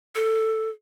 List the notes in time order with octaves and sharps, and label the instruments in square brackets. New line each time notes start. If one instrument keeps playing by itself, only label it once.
[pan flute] A4